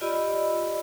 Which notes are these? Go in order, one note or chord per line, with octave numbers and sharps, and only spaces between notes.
F4 G4 D5 D#5 B5 E6